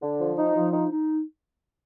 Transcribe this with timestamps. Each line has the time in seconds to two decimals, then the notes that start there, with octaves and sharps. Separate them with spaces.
0.02 D3
0.20 F3
0.38 D#4
0.55 F3
0.73 D#4
0.90 D#4